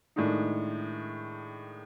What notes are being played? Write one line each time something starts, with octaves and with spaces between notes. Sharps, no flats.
A2 D#3 G#3 D4 D#4